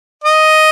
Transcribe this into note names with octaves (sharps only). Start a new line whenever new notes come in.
D#5